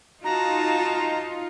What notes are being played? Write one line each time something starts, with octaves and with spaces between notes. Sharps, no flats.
D#4 F4 F#4 A5 A#5